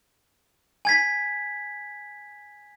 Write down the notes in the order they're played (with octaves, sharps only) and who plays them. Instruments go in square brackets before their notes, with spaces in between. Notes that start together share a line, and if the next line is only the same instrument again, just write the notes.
[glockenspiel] G#5 G#6 B6